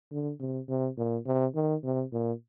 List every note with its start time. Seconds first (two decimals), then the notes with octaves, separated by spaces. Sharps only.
0.11 D3
0.40 C3
0.69 C3
0.97 A#2
1.26 C3
1.55 D#3
1.83 C3
2.12 A#2